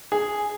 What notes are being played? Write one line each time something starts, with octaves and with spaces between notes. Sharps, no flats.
G#4